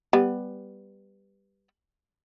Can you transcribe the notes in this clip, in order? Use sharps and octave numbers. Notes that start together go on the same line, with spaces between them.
G3 B3